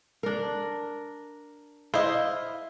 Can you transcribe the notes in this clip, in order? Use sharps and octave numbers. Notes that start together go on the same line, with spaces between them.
D4 A#4
E4 C5 D#5 F5